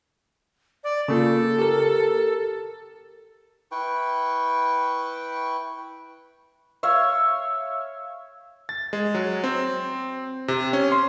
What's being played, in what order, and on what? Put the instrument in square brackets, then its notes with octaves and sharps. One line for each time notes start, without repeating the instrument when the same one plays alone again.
[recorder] D5
[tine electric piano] C#3 A#3 F4 [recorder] A4
[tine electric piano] G4 A#4
[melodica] E4 B4 G5 C#6
[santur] C#5 E5 F5
[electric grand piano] A6
G#3
F#3
C4
C3
C#4
C6